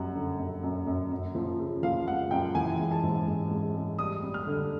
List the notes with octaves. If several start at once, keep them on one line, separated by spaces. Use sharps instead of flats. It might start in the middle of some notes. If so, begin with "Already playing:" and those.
Already playing: F#2 G3 F#5
D3
F#2
F#2
F#2
F#2
F3
C#3
F3 F5
G#3 F#5
F#2 G5
E3 G#5
G#3
A5
G#2
G#2
G#3
G#3
G3 D#6
G3
F6
D3